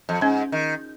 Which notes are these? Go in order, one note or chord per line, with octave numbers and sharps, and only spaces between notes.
F2
G#2 C#4
D#3